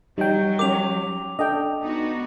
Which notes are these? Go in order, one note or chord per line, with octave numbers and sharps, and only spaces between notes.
F#3 G3 D#4 G5
C#4 A#4 D6 F7
D4 A4 D#5 G5
B3 D#4 F#4